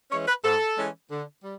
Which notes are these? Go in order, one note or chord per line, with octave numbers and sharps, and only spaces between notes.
E3 G#3 C#4 C#5
B4
G#2 A4
E3 G#3 C#4
D3
G3